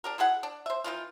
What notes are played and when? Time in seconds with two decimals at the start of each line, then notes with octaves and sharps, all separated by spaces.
0.04 D4 G4 A#4
0.18 B2 E4 G#4 F#5
0.43 D4
0.66 C5 E5
0.84 D#3 E3 A#3 F4